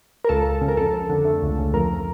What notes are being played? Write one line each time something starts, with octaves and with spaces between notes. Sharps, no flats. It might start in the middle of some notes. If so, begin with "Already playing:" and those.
A#4
C#2 A4
C#2
C#3
A#4
F2 A4
F2
D3
A3
C#2
C#3
F2 A#4